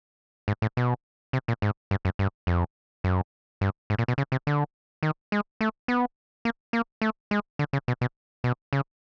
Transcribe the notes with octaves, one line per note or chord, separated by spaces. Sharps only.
G#2
A2
B2
C3
A#2
G#2
G2
F#2
G2
F2
F#2
G2
G#2
A#2
B2
C#3
C3
D3
D#3
G#3
A3
B3
A#3
A#3
A3
G#3
D3
C#3
B2
B2
B2
C#3